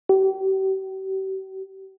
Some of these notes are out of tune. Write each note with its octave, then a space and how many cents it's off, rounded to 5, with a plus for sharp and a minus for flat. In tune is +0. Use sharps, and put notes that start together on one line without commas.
G4 -40